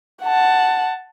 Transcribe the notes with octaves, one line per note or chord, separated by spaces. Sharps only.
F#5 A5